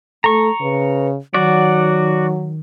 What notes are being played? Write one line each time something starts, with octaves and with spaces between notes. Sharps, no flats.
A3 A4 A#5 C#6
C#3 B4
D#3 F#3 F#4 D5